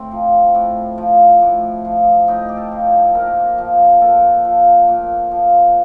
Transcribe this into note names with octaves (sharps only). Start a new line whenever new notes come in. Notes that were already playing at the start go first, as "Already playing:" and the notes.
Already playing: A2 C4
F3
A2
F3
A2
F3
A2 D#4
G4
A4
F3
A#2 A#4
F3
A#2 A4
F3
A#2
F3